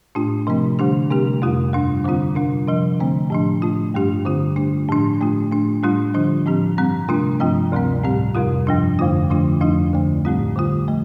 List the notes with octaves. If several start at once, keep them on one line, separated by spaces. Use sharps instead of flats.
A2 A3 D4 F4
C3 F3 A3 C4
D3 G3 D4 G4
C3 A3 C4 G4
F2 C3 G3 F4
G2 G3 D4
D3 G3 C4 F4
C3 G3 D4
C3 F3 D4
D3 A3 C4
A2 F3 D4
A2 A3 F4
G2 G3 D4 G4
D3 G3 C4 F4
D3 A3 D4 G4
A2 F3 D4
A2 A3 F4
A2 A3 D4
A2 G3 D4 F4
D3 F3 D4 F4
A2 F3 C4 G4
G2 G3 C4
C3 A3 D4 F4
G2 F3 C4 F4
D2 C3 G3 C4
A2 G3 C4 G4
F2 C3 G3 F4
G2 F3 D4
F2 D3 A3 F4
D3 F3 A3 D4 F4
F2 F3 D4 F4
D2 D3 A3
A2 G3 C4 F4
D3 A3 F4
F3 A3